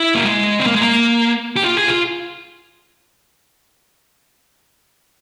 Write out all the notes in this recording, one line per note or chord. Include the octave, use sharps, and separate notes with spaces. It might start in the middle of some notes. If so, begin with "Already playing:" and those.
Already playing: E4
A#3
G#3
C4
A#3
G#3
A#3
G4
F4
G#4
F4